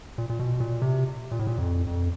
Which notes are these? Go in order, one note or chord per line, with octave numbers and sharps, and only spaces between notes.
A#2
A#2
B2
A#2
C3
A#2
A2
A#2
F2
F2